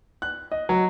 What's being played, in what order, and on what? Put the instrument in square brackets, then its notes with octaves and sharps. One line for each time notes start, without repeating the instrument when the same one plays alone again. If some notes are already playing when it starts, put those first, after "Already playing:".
[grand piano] F#6
D#5
F#3